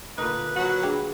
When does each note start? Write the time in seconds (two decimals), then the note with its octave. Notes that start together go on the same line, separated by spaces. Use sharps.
0.18 A#2 D3 D#4 B4
0.56 F#3 F#4
0.83 D4 G#4 F5 G5